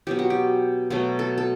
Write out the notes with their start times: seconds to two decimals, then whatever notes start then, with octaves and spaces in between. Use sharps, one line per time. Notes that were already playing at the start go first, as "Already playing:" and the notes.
0.07 B2 F#3 B3 G4
0.19 F#4
0.30 G4
0.90 B2 F#3 A3 F#4
1.19 A4
1.38 A4